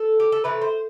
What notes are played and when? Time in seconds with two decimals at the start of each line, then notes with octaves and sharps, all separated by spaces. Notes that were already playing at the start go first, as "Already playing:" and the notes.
Already playing: A4
0.20 G4
0.32 A4
0.44 C3 E3 A3 B4
0.61 C5